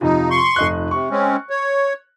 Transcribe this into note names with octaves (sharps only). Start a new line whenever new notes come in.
F2 C3 F3 D#4
C6 C#6
F1 D#5 F#6
C3 C#6
G#3 C4 C#4
C#5